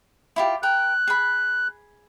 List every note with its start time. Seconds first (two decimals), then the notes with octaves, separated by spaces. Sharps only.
0.36 E4 F4 G4
0.63 A#4 G5 F#6
1.07 G#4 B5